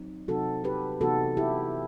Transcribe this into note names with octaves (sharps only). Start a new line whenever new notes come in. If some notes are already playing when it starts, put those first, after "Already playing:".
Already playing: F#3 C4 D#4
C3 F#3 C4 D#4 F#4 A4
G4 B4
C3 E3 B3 D#4 F#4 A4
E4 G4